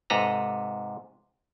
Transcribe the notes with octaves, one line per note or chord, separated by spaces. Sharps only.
G#2 C3 A4 B4 A#5